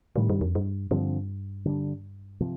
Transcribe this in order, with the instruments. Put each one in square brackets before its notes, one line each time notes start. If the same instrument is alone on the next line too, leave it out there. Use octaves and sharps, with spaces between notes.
[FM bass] A2 [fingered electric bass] C3 D#3 G3
[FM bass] G2
F2
G2
[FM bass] G2 [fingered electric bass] D3 F3 C4
[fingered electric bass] D3 G3 D4
C3 F3